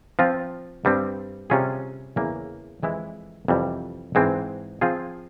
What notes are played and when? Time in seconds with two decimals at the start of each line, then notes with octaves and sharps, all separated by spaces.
0.19 F3 C4 F4
0.85 G2 G3 C4
1.50 C3 G3 C#4 F4 G#4
2.16 E2 C#3 E3 A#3
2.83 F2 E3 G#3 E4
3.48 F2 C3 E3 G3
4.15 G#2 E3 G#3 C4
4.81 F3 C4 F4 G#4